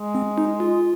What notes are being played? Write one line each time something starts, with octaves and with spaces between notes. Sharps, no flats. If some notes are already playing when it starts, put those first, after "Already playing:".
Already playing: G#3
C4
D#4
F4